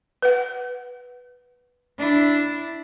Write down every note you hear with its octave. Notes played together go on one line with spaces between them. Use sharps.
B4 F#5
D4 E4